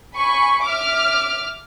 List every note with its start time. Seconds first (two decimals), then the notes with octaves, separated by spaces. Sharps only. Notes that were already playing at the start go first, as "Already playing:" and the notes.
0.15 G#5 B5 C#6
0.63 E5 D6 F6